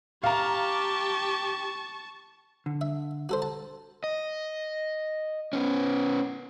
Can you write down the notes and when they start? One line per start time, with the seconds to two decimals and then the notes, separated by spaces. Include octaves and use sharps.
0.24 G4 F5 A5 A#5 C#6
2.66 D3
2.81 E5
3.29 F#4 A4 C5
3.42 A5
4.04 D#5
5.53 B3 C#4